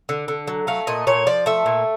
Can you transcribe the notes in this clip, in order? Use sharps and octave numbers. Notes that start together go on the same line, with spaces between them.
D3
D3
F#3
A3 F5
A#2 D#5
A#2 C#5
F3 D5
A3 E5
A#2